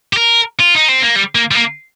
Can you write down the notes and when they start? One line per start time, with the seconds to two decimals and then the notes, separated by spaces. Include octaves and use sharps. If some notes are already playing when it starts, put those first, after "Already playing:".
0.13 G4
0.17 A#4
0.60 F4
0.75 D#4
0.88 C4
1.02 A#3
1.16 G3
1.35 A#3
1.51 G3
1.55 A#3